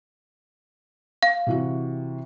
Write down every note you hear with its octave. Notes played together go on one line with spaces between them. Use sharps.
F5
C3 E3 F#4